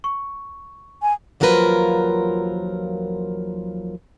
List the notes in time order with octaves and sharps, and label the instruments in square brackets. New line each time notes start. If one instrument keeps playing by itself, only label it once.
[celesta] C#6
[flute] G#5
[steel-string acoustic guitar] D#2 F3 F#3 F4 A#4 B4